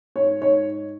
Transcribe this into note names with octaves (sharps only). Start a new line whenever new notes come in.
G#2 C#5
G#2 C#5